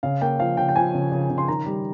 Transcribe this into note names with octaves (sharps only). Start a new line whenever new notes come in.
C#3 F5
A#3 G5
F3 F5
C#3 G5
G5
F3 G#5
C#3
C#3
C#3
C6
D#3 A#5
G3